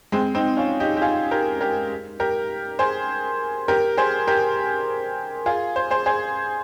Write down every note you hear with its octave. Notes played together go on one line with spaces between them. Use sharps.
G#3 C4
C4 D#4
C#4 F4
D#4 G4
G4
F4 G#4
G4 A#4
G4 A#4
G4 A#4
G#4 C5
G4 A#4
G#4 C5
G4 A#4
F4 G#4
C5
G#4 C5
G#4 C5